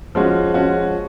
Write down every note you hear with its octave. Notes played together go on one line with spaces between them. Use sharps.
F3 G#3 C#4 F#4
F3 G#3 C#4 F#4